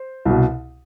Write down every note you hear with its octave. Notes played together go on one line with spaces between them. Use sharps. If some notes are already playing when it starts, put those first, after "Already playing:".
Already playing: C5
C2 B2